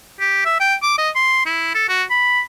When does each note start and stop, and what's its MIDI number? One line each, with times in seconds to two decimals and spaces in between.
0.20 0.41 67
0.46 0.56 76
0.60 0.75 79
0.82 0.94 86
0.98 1.10 75
1.15 1.44 84
1.46 1.73 64
1.74 1.88 69
1.89 2.04 66
2.10 2.41 83